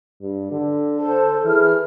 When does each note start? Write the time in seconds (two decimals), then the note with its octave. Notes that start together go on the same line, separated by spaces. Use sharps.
0.21 G2
0.51 D3
0.98 A4 C5 A5
1.45 E3 G#4 F6